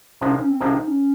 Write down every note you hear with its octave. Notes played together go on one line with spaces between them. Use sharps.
C2 C3 F3 G#3 C#4
D#4
C#4
C4
C2 C3 F3 G#3 C#4
D#4
C#4